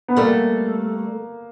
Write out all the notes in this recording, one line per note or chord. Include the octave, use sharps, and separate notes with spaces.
B3
G3 A3 A#3